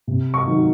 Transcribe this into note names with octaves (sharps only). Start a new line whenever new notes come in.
C3
C#6
D#3 F#3